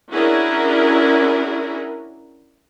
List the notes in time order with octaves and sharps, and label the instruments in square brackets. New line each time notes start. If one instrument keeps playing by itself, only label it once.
[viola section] C#4 D4 E4 F#4 G#4 A#4